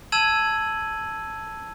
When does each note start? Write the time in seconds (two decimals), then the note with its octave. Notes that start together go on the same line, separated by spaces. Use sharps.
0.12 A5 E6 G#6 D#7 F#7